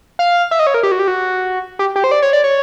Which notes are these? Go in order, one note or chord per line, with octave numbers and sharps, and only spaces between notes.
F5
E5
D#5
C#5
A#4
G4
F#4
G4
F#4
G4
G4
C5
D5
C#5
D5
C#5